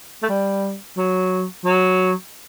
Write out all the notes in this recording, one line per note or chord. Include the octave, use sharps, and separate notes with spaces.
A3
G3
F#3
F#3